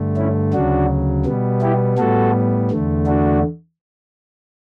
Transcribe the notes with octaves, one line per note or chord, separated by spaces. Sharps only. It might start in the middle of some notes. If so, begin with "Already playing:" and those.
Already playing: G2 D3 A3
C#4 E4
D2 C#3 F#3 D4 F#4
B2 G3 B3
E4 G4
A2 G3 B3 F#4 A4
E2 D3 A3
D4 F#4